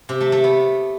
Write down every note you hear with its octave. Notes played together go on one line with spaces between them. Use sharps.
C3
A3
A3
B3